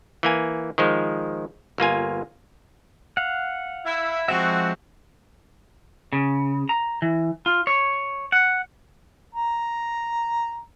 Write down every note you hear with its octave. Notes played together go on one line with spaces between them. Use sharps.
E3 A#3 G#5
D#3 F3 G#3
G1 A#3 F4 G#5
F5 F#5
E4
F3 G#3 C4 F#4 E5
C#3
A#5
E3
F4
C#5
F#5
A#5